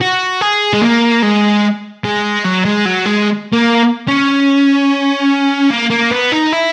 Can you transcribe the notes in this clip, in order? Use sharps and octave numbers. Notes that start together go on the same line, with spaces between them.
F#4
G#4
G#3
A#3
G#3
G#3
F#3
G#3
F#3
G#3
A#3
C#4
A#3
A#3
B3
D#4
E4